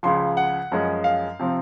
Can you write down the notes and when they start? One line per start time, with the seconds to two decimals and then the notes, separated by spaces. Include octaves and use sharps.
0.03 C#2 C#3 F3 C6
0.37 F#5
0.72 F#2 F3 G#3 C#4
1.04 F5
1.39 C3 F3 C4